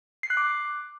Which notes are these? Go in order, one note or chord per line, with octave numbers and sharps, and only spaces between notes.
C7
F#6
D6